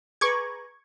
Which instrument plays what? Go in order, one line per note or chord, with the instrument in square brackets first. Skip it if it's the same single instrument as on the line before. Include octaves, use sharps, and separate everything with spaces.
[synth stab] G#4 B4 A#5 [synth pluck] C#6 D6 G#6